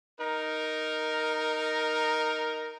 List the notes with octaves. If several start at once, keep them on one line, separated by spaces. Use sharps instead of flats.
D#4 A#4